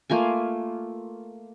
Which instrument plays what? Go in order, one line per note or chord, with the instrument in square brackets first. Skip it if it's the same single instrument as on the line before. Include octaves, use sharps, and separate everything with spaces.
[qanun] A3 A#3 F4 G#5